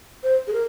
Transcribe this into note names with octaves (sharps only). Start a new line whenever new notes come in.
C5
G#4
A#4